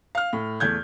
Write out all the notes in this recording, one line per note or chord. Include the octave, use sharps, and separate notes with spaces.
F5 F6
A2
E2 A3 G6 G#6